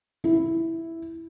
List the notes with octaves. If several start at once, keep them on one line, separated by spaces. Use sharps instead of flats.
E4